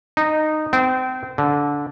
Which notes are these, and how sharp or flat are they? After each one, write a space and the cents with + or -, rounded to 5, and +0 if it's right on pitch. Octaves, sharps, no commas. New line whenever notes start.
D#4 -15
C4 -30
D3 -20